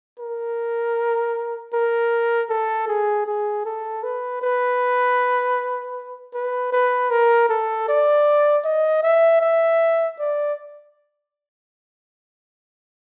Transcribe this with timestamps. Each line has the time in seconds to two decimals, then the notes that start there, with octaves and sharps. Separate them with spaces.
0.19 A#4
1.73 A#4
2.49 A4
2.88 G#4
3.26 G#4
3.65 A4
4.03 B4
4.42 B4
6.34 B4
6.72 B4
7.10 A#4
7.49 A4
7.88 D5
8.64 D#5
9.03 E5
9.41 E5
10.19 D5